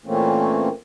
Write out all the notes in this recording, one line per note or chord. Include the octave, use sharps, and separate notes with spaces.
A#2 E3 A3 A#3 C4 C#4